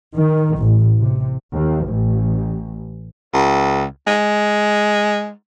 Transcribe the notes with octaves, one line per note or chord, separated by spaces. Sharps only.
D#3
A1
C3
D#2
A1
C#2
G#3